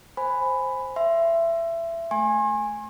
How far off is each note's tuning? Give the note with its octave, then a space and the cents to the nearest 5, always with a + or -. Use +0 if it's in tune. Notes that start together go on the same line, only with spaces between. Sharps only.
C5 +0 G#5 +0 B5 +10
E5 +20 C6 +0
A3 +0 G#5 -5 C6 +45